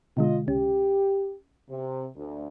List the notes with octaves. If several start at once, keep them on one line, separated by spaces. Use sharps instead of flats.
B2 D3 G#3 F4 D#5
C2 C#4 G4
C3
D2